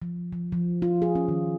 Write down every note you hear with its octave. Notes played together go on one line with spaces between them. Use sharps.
F3
F3
F3
F4
G#4
C#4
D#3